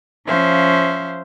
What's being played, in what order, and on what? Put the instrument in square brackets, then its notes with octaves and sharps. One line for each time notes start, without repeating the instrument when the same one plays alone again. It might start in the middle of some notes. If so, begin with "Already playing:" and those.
[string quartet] F3 C#4 C5 E5 F5